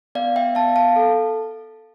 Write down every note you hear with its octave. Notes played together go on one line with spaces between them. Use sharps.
B3 D5 F5
E5 G5
B3 F5 A5
F5 A5
A4